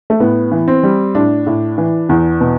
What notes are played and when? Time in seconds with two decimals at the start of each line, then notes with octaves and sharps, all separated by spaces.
0.10 A3
0.20 A2 B3
0.52 E3
0.68 C4
0.83 G3
1.15 A2 D4
1.47 A2
1.78 E3
2.09 E2
2.41 B2